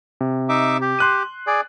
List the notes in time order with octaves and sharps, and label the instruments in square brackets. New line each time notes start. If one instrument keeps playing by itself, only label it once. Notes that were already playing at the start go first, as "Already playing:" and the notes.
[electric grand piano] C3
[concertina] D#4 E5 D6
G4
[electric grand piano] C6 F#6 D#7
[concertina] G#4 D5